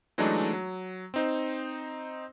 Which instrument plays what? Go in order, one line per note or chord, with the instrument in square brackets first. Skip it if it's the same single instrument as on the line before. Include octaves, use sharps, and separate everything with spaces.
[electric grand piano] E3 F#3 G#3 A3 D4 D#4
F#3
C4 D#4 C5